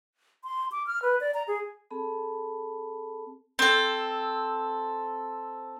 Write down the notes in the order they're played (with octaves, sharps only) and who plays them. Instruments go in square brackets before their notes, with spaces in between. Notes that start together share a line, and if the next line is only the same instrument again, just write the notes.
[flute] C6
D6
F6
B4
D5
A#5
G#4
[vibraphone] C4 G#4 A4 A5 B5
[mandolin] C4 A4